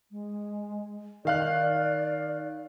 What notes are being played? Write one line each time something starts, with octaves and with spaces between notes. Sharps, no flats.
G#3
D#3 D5 F5 F#6